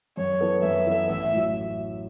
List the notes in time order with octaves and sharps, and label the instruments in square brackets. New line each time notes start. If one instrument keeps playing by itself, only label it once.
[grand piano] F#2 [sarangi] C#5
[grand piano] E3 B3 A4
[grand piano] F#2 [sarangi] E5
[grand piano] E3 B3 A4
[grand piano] A1 [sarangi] E5
[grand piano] A2 F#3